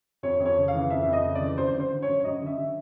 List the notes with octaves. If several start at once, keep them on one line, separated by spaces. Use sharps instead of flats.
F2 C#5
F2
C#5
C#3
F5
E3
F2 E5
F2
D#5
C#3
D5
E3
F#2 C5
D3
C5
D3
C#5
F#2
F#2 D#5
D3
E5
D3